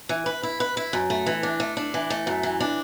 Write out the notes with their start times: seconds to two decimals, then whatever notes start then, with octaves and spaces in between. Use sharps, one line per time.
0.09 E3
0.26 B4
0.43 E4
0.60 B4
0.77 E4
0.93 F#2
1.10 A3
1.26 E3
1.43 D4
1.60 A3
1.77 D4
1.94 E3
2.10 A3
2.27 F#2
2.43 E3
2.60 D4